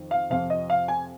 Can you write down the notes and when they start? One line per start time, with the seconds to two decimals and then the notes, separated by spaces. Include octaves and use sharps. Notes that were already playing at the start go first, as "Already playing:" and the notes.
Already playing: F2 D#3
0.11 F5
0.30 F2 C3 F3 F5
0.50 D#5
0.70 F5
0.88 G#5